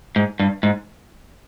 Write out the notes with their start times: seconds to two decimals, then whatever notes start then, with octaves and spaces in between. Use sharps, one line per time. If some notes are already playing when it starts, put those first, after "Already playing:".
0.16 G#2
0.40 G2
0.63 G#2